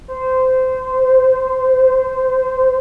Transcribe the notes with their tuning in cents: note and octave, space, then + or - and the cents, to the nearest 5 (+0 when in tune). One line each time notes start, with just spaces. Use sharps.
C5 -20